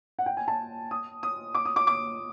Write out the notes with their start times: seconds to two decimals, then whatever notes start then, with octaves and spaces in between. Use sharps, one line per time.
0.19 F#5
0.26 G5
0.37 G#5
0.48 A5
0.91 D#6
1.23 D#6
1.55 D6
1.65 D#6
1.76 D6
1.87 D6